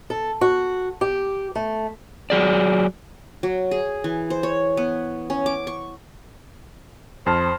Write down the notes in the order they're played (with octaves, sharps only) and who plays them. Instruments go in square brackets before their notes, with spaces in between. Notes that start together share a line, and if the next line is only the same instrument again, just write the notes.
[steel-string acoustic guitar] A4
F#4
G4
A3
[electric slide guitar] F#3 G#4 D5
[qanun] F#3
G#4
E3
C5
C#5
B3
C#4
D6
C#6
[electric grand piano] F2 A5 F6 [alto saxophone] C5